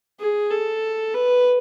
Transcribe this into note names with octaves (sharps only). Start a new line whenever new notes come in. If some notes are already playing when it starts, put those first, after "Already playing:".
G#4
A4
B4